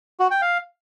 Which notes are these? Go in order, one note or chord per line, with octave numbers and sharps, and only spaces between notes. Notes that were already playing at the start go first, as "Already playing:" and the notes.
F#4
G5
F5